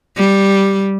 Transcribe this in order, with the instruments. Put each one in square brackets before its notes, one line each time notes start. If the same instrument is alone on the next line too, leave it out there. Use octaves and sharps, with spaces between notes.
[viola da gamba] G3